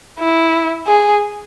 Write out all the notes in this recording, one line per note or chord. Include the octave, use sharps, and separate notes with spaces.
E4
G#4